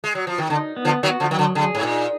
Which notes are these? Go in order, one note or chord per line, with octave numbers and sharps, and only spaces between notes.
G#3
F#3
F3
D#3
D3 D#4
B3
D3 F3
D#3 F#3 F#4
D3 F3
D#3 F#3
D3
D3 G#4
G#2
A#2 D#4